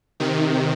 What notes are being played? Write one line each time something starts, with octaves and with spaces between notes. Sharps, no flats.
C3 D#3